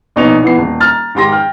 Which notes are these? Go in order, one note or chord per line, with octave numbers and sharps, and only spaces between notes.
A#1 B2 D#4 C#5 F7
E3 B3 C7
D#1
A#5 F6 A6
G#2 D#3 G4 C6 A#6
G5 F6